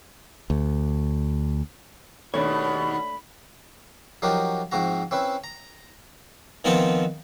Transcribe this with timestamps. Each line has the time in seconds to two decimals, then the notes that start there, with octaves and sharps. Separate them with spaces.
0.50 D2
2.34 D#2 B2 A3 D4 C#5 B5
4.22 F3 F#3 D#4 F#4 G4 A#4
4.72 G#2 F3 C4 F#4 A#5
5.11 C4 C#4 E4 B4
5.44 A#5
6.64 D#3 F3 B3 C4 B4